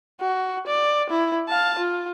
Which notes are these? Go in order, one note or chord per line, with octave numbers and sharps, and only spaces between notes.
F#4
D5
E4
F5 A5
F4